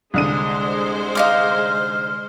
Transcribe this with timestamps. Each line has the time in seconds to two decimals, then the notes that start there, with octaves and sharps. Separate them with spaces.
0.14 C2 D3 G#3 C5 D#6 D#7
1.15 D#4 F5 D6 F6